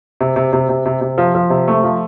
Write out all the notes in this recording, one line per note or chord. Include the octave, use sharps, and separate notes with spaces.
C3
C3
C3
C3
C3
C3
F3
F3
C3
A3
F3